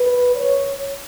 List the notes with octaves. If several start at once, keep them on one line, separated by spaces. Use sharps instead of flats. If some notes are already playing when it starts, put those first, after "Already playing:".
Already playing: B4
C#5